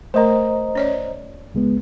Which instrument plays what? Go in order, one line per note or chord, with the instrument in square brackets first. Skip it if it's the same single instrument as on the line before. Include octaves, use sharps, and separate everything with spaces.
[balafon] A3 A#4 [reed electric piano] C5 D#5 A#5
[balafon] C#4 C#5 D5
[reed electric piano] C#2 G#3 B3